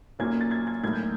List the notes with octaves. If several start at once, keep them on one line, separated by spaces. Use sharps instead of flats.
B1 A#2 F#3 A#3 C#4 G#6
A6
G#6
G#6
B1 A2 F#3 A#3 G#6
G6